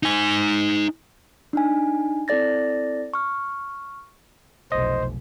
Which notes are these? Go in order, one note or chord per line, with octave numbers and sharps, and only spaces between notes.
D#4 G#5
D4 D#4 G#5
C4 E4 A4 D5 A6 A#6
C#6 F6
F1 B1 C5 D#5